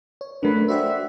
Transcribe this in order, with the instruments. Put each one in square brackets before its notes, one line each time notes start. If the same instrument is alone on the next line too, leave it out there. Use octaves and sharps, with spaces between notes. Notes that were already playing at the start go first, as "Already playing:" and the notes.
[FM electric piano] C#5
[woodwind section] F#2 B4 [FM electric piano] A3 D4
[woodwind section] F#4 E5 [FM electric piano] C5 D5 G5